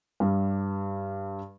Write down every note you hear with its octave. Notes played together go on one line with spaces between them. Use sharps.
G2 G3